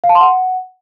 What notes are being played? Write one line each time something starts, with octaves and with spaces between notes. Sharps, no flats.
F5
A5
C6
F#5